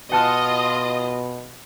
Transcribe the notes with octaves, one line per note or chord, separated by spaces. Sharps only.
B2 F4 D#5 F#5 A5 F6